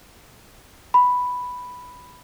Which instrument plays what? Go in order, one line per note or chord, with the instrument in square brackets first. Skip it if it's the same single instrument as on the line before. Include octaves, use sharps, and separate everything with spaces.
[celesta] B5